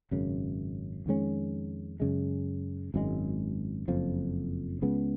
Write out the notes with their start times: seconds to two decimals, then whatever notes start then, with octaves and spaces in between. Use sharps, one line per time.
0.11 G#1 F#2 C#3
1.06 F2 D#3 G#3 C#4
2.00 F#2 C#3 G#3
2.94 G#1 F#2 D#3 G#3
3.88 F#1 F2 F3
4.82 C#2 C#3 G#3 B3